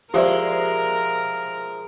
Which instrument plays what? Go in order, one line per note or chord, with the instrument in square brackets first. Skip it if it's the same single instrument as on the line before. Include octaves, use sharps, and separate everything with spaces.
[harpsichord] F3 E5 [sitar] G#3 [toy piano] G4 C5 D5 [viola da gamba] A#4